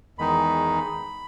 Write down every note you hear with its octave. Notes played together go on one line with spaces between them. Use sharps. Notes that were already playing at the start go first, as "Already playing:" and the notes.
E2 D#3 G#3 D#4 B5